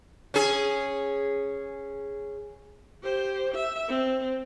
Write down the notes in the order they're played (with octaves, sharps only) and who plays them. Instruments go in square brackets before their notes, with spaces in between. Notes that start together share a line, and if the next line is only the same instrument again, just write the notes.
[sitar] C#4 G#4
[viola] G4 C5
E5
C4